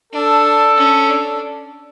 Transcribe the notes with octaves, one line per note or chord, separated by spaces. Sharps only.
D4 A4
C#4
D4